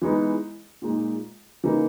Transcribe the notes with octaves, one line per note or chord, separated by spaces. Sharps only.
E3 G#3 B3 D#4
A#2 G#3 D#4
C#3 E3 A#3 D#4